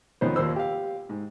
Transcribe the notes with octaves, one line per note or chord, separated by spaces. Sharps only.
F2 D#3 B3 C#4 D#4 C5
D#2 A#2 A#3 C5 E6
G4 F5
G#2